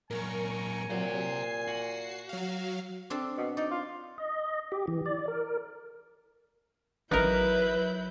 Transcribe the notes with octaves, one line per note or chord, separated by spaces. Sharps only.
A#2 F#3 A#4 G#5 C#6
A#2 F#3 G4 C5
C7
F#4
F#3 F5
C4 D4 A4
B2
D#4 D5
F4
D#5
G4
E3
D5
A#4
A1 F#3 D#4 E4 A#4 B4 G6